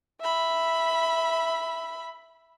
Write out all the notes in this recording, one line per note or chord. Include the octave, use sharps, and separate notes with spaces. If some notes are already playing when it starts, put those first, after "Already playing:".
E5 B5